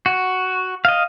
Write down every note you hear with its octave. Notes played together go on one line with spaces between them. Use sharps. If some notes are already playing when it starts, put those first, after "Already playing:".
F#4
D#5 F5